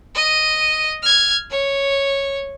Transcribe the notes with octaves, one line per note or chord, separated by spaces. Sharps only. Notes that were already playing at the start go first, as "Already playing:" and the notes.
D#5 D#7
F6 G#6
C#5